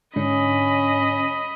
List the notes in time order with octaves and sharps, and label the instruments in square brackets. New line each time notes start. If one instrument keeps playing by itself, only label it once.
[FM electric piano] G#2 D3 D4 [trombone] C#4 [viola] D#5 B5